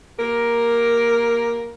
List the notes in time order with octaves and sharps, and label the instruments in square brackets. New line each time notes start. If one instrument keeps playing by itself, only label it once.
[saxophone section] A#3 G4 A#4